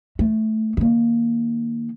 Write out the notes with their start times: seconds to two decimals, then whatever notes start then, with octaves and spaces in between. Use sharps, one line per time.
0.19 A3
0.77 D#3 A#3